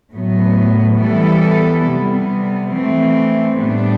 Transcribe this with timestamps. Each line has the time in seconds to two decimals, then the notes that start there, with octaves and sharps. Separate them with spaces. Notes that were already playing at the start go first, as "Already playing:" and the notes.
0.13 A2 F#3 B3
0.99 E3 G3 B3 E4 A4
1.86 C3 G3 B3
2.73 E3 A3 C4
3.60 A2 G3 B3 D4 G4